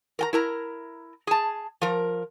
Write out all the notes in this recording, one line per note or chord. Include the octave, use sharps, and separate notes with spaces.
A#4 G5 A#5
E4 A#4 A#5
G#4 A5
F3 A#4